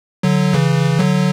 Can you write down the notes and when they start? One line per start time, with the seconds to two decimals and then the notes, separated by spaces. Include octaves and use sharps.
0.23 D3 F#3
0.54 C#3 E3
0.99 D3 F#3